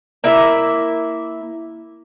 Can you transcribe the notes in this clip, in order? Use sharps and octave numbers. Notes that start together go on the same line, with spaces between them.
A#3 E4 E5